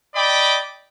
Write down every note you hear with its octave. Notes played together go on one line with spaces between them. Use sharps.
D5 D#5 G5 B5 D6